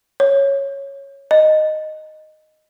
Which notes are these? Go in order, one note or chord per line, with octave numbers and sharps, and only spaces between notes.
C#5
D#5